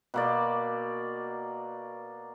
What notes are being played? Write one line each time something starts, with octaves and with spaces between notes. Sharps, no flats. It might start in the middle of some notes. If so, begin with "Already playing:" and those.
B2 A#3 D5